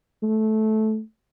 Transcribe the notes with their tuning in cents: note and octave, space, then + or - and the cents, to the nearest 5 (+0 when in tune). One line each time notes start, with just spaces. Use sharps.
A3 -15